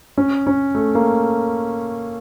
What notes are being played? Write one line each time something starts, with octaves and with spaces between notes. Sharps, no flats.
C#4
C#4
A3
A#3